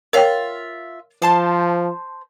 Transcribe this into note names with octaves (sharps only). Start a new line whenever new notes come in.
F4 A#4 C#5 E5 G5
F3 C5 A5 C6